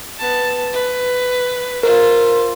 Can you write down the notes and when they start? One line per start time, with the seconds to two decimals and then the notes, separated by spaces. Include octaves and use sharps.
0.19 B3 A5
0.73 B4
1.83 F4 A#4 C5